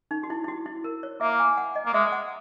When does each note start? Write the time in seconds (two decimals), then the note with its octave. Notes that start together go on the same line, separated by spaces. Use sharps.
0.11 D#4
0.23 F#4
0.30 E4
0.44 E4
0.48 F#4
0.66 E4
0.84 A#4
1.03 C#5
1.21 A#3 E5
1.40 G#5
1.57 F#5
1.76 D#5
1.86 A#3
1.94 G#3 E5
2.12 F#5